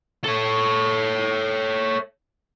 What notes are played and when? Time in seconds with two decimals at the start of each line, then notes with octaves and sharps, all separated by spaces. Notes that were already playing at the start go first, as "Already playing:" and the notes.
0.24 A4 C#5